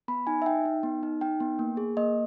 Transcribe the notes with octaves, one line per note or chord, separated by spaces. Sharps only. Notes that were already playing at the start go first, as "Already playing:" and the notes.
B3 B5
D#4 G#5
E5
D#4 G5
D#4
B3
D#4
D#4 G5
B3
A#3
G#4
A#3 D#5